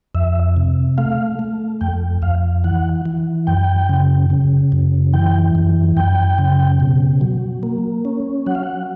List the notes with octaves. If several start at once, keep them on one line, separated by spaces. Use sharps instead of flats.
F2 E5
C3
A3 F5
A3
F2 G5
F2 F5
E3 F#5
E3
F#2 G5
C#3
C#3
F#2
E3 G5
F#2
F#2 G5
C#3
B2
F#3
A#3
C#4
F#3 F#5
F5
F#5